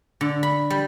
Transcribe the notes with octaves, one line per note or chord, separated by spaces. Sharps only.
D3
B5
G3